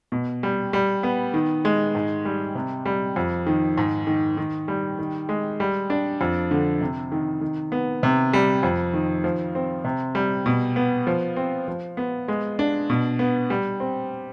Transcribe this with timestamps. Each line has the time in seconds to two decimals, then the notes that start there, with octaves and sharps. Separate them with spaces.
0.12 B2
0.43 G3
0.73 G3
1.03 B3
1.34 D#3
1.65 G#3
1.95 G#2
2.25 G3
2.55 C3
2.86 G3
3.16 F2
3.47 D#3
3.78 G#2
4.07 D#3
4.37 D#3
4.68 G3
4.99 D#3
5.29 G#3
5.60 G3
5.90 D4
6.21 F2
6.51 D3
6.81 C3
7.12 D#3
7.41 D#3
7.72 B3
8.03 C3
8.33 G3
8.63 F2
8.94 D#3
9.24 F3
9.55 C4
9.85 C3
10.15 G3
10.46 B2
10.76 B3
11.07 F3
11.36 C4
11.68 F3
11.97 B3
12.28 G#3
12.59 D4
12.90 B2
13.19 B3
13.50 G3
13.80 C4